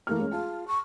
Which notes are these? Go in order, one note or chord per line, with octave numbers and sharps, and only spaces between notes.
E3 A3 A#3 F6
G#3 C#4
F4 G#4 A5
C#6